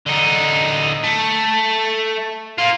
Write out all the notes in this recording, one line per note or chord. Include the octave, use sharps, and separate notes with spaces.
D3 D#4
A3
A#3 F4